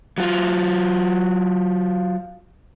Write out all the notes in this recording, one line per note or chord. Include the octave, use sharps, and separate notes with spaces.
F#3 F4